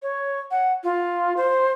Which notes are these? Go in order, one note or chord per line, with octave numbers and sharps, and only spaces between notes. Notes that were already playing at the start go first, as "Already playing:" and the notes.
C#5
F#5
F4
C5